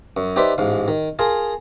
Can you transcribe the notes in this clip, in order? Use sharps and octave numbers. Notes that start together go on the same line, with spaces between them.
F#2
D#4 G4 B4 C5 D5 E5
A1 G#2 F5
D#3
F4 G#4 A#4 F5 A5